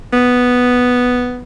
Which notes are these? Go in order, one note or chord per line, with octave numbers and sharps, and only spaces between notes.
B3